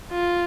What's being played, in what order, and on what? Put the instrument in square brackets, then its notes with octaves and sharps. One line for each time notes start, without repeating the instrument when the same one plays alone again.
[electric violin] F4